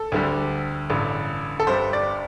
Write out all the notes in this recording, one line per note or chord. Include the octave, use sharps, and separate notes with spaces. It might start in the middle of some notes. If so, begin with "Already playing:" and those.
Already playing: A4
D2 D3 G3
A1 G2 D3
A4
G1 G2 G3 C5
D5